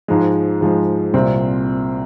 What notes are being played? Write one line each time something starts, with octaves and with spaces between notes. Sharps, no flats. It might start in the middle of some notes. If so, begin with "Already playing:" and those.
G#2 F3 G#3
G#2 F3 G#3
C2 A#2 G3 C4